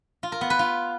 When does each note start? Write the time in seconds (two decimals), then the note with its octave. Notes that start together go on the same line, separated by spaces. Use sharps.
0.23 F4
0.32 A#4
0.41 B3
0.50 B4
0.59 F4